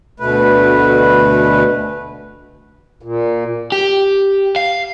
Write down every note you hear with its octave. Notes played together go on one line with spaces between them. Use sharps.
D2 B2 A3 B4
A#2
G4
F5